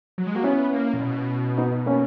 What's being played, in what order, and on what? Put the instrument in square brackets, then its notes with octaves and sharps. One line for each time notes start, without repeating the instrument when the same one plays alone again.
[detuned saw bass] F#3
G#3
[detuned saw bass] A#3 [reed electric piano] F#4
[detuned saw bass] B3 [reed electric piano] C#4 E4
[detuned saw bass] A#3
A#2
B2
[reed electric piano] B3 D#4
A#3 C#4